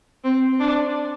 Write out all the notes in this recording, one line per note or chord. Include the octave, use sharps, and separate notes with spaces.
C4
D4